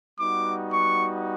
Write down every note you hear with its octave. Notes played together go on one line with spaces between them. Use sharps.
G3 B3 D#4 F#4 D6
C#6